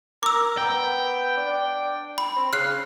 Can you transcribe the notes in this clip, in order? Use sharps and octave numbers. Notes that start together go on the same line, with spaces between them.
A#4 D6 E6
B3 G5
D4
B5
C4
C#3 F6 F#6 C7